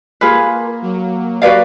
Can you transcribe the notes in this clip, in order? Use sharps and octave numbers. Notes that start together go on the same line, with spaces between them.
A#3 F4 G#4 B4
F#3
F#4 B4 D5 F5